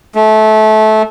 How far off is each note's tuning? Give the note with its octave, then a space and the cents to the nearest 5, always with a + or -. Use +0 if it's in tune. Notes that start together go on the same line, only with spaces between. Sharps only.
A3 -20